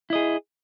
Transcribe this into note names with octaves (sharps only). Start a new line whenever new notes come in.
E4 G#4 D#5